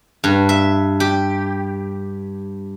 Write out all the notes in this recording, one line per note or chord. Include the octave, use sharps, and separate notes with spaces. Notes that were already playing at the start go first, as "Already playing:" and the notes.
G2
E5
G4